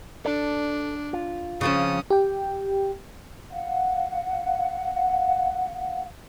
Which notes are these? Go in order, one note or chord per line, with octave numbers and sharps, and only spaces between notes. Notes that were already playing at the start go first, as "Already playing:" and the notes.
D4 A4 D5
F4
C#3 F3 C4 C#4 D#6
G4 G5
F5 F#5